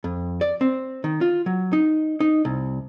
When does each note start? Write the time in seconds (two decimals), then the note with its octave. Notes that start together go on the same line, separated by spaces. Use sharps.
0.04 F2
0.41 D5
0.61 C4
1.04 D#3
1.21 F4
1.46 F#3
1.73 D#4
2.20 D#4
2.45 C2